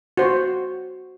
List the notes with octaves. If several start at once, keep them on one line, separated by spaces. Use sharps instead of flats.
F#4 C5